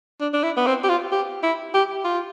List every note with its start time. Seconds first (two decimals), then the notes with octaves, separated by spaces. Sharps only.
0.21 D4
0.33 D4
0.44 E4
0.57 B3
0.66 C4
0.84 G4
0.89 F4
1.12 G4
1.43 E4
1.74 G4
2.05 F4